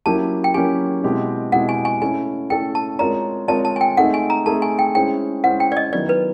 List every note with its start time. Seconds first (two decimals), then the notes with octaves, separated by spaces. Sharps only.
0.06 F#3 A#3 C#4 E4 G4 A5
0.44 G5
0.54 F#3 A#3 C#4 E4 G4 G#5
1.04 B2 G#3 C4 E4 G4
1.52 B2 G#3 C4 E4 G4 F#5
1.69 G#5
1.85 G#5
2.01 A3 C#4 E4 A4 G#5
2.50 A3 C#4 E4 A4 G5
2.75 A5
2.99 G#3 C4 F4 A#4 C#5 A#5
3.48 G#3 C4 F4 A#4 C#5 A5
3.65 A5
3.76 G#5
3.81 G5
3.97 A3 C4 D#4 G#4 F#5
4.14 G#5
4.30 A#5
4.46 A3 C4 D#4 G#4 A5
4.62 G#5
4.79 G5
4.95 G#3 C#4 E4 G#4 C5 G5
5.44 G#3 C#4 E4 G#4 C5 F#5
5.60 G5
5.72 D5
5.77 D#5
5.93 D#3 F#3 B3 E4 D5
6.09 B4